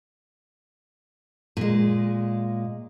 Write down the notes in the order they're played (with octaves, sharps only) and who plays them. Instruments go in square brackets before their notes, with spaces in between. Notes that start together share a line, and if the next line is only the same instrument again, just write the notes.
[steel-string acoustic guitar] A#2 G#3